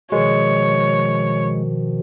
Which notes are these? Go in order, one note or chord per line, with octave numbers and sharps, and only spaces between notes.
B2 D#3 F3 G#3 C#5